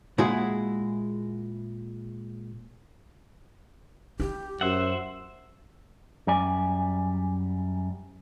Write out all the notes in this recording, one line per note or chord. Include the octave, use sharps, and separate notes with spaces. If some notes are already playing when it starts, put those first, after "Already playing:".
A#2 G#3 E4 F#4 G#4
E4 G4
F#2 C5 E5 F#5
F#2 G3 D5 G#5